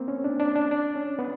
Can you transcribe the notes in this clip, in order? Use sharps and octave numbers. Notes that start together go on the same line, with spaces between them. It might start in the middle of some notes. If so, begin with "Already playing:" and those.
Already playing: A#3 C4
C#4
D4
D4
D4
D4
C#4
B3